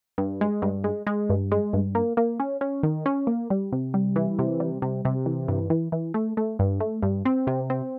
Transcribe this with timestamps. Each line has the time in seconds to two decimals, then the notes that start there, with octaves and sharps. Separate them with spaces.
0.18 G2
0.41 G#3
0.62 G2
0.84 G#3
1.07 G#3
1.30 G2
1.52 G#3
1.73 G2
1.95 A#3
2.17 A#3
2.40 C#4
2.61 C#4
2.83 D#3
3.06 C#4
3.27 A#3
3.50 G3
3.72 C3
3.94 G3
4.16 E3
4.39 C3
4.60 G3
4.82 C3
5.05 C3
5.26 E3
5.48 G2
5.70 E3
5.92 E3
6.14 A3
6.37 A3
6.59 G2
6.80 A3
7.03 G2
7.25 C4
7.47 C3
7.70 C4